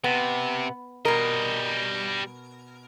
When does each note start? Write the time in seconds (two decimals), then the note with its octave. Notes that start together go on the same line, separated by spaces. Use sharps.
0.04 C3 B3
1.05 B2 G3 A#4 D#5